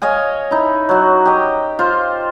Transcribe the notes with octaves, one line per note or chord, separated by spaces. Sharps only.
C#5 D#5 F5 G#5
D#4 E4
F#3 F#4
G4 D#5
F4 C5